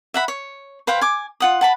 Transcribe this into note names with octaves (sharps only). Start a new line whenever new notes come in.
E5 F#5 B5
C#5
B4 C5 F5 G5
G#5 D6
F4 F#5 D#6
F#5 A5 B5